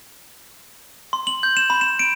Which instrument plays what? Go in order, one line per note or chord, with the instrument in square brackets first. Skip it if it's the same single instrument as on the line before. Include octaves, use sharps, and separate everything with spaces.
[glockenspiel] C6
F#7
G6
E7
B5
E7
D7